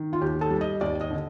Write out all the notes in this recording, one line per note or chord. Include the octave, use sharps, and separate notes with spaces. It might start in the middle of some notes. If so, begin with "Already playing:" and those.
Already playing: D#3
F4
D#2 G4
A4
G3
D#5
D#2 D5
D#5
D3